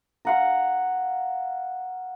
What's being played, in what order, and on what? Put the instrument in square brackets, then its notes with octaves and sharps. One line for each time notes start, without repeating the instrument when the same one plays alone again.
[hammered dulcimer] F5 F#5 A#5